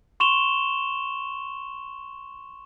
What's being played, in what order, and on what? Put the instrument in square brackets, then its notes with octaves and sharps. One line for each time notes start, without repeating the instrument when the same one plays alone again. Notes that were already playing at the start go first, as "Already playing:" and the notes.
[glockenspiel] C6 C#6 E7 F7 G7